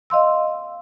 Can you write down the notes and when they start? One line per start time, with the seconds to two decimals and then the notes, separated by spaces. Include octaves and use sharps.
0.10 D#5 F5 C6 E6